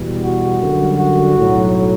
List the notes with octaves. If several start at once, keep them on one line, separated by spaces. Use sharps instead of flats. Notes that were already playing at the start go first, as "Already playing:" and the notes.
Already playing: E2 B2 G3
F#4
F#2 D3 G3
F#4
B1 A2 F#3